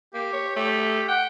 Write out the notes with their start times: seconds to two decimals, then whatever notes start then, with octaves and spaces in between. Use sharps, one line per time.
0.15 A#3 G4
0.33 C#5
0.56 A3 G4
1.08 F#5 G5